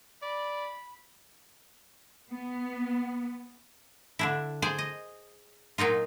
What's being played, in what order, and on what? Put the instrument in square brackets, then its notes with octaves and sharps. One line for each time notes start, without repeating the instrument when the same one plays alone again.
[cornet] D5 [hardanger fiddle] B5
[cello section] B3
[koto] D3 D4 E4
G#4 C5 D5
D#5
A#2 F#3 A#3 D#4 F4